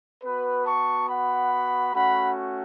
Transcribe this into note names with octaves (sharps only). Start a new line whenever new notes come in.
B3 F#4 B4
A5 C#6
F#5 B5
A3 C#4 F#4 F#5 B5